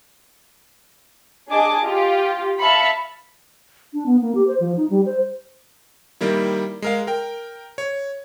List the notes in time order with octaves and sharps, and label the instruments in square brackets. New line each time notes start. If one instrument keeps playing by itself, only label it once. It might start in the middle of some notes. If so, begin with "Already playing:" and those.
[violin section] D4 G#4 D#5 G#5 A5 D6
F4 G4
E5 F5 A5 B5 C#7
[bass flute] D4
B3
A#3
G4
C5
F3
D#4
G3
C5
[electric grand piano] D#3 G3 A#3 E4
G#3 A#4 F5
A#4 G5
C#5